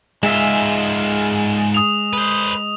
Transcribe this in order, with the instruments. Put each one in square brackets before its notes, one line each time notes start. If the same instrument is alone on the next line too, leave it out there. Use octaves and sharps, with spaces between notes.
[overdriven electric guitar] G#2 F4 [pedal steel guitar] G#3 G#4 E5 [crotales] E7
[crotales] D#6 F7
[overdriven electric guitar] B4 C5